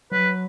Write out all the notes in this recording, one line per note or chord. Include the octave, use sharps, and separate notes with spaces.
F#3 B4